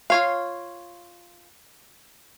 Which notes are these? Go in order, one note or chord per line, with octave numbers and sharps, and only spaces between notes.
F4 C#5 F5